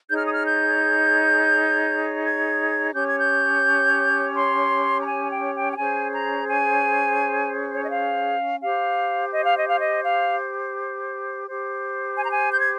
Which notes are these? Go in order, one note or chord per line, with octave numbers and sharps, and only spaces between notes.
D#4 G#4 C#5 G6
F6
D#6
F6
G6
G#6
C#4 G4 C#5 G6
G#6
G6
C6
A#5
G#5
G5
G5
G5
C#4 G#4 C5 G#5
A#5
G#5
C#5
D#5
F5
G4 C5 F5
D#5
F5
D#5
F5
D#5
F5
G4 C5
G#5
A#5
G#5
G6
G#6